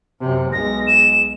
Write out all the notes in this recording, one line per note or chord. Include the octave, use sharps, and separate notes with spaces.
F#2 C3
B1 G#3 A#6
E7